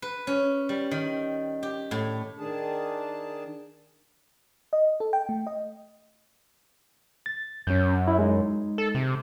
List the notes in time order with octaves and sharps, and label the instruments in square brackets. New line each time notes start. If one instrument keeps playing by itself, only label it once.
[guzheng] B4
C#4
G3
D#3
G4
A2
[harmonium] D#3 D4 G#4 A5
[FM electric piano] D#5
A4
G5
A3
D#5
[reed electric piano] A6
[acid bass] F#2 [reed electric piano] C#4 G6
[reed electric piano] E4
G#3 D#4
[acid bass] A4
C3